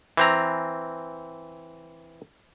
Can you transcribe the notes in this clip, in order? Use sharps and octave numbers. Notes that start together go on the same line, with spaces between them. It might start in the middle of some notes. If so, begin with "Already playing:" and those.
E3 C4 A#5